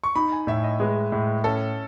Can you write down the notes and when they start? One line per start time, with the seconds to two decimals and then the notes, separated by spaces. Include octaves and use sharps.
0.04 C#6
0.15 D#4 B5
0.32 G#5
0.47 A2 E5
0.64 D#5
0.80 G#3 B4
1.12 A2
1.44 C#4 A4